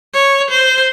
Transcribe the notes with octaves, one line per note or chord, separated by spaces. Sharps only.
C#5
C5